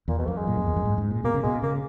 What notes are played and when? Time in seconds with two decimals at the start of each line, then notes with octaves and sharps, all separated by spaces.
0.08 E2 A#2
0.19 B2
0.27 F#2 A#3
0.37 G#3
0.47 A#2
0.57 F#2
0.67 E2
0.76 F#2
0.85 G#2
0.98 G#2
1.11 A#2
1.24 B2 A#3
1.34 C#3
1.43 B2 G#3
1.62 C#3 A#3